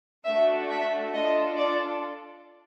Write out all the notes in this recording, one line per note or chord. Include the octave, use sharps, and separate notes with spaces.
A3 D4 F#4 E5
E5
D4 F4 A4 D#5
D5